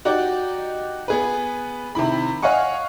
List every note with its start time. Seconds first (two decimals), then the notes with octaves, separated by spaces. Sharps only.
0.05 D#4 F#4 G4 D5
1.08 B3 G#4 B4
1.95 C3 D#3 E4 B5
2.43 C#5 D#5 F5 F#5 G#5 C#6